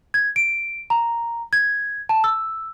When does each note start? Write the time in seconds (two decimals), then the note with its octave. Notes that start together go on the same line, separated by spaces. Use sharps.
0.14 G#6
0.36 D7
0.90 A#5
1.53 G#6
2.09 A5
2.24 E6